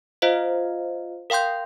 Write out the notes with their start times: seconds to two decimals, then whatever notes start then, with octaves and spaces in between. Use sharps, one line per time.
0.22 F4 C5 D#5 F5
1.30 A#4 F5 G5 C6 G6